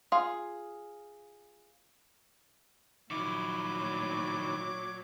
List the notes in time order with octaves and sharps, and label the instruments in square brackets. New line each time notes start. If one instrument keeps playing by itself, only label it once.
[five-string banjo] F4 G#4 F5
[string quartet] A#2 F#3 [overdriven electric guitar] D#3 E4 [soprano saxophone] D6
[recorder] C#5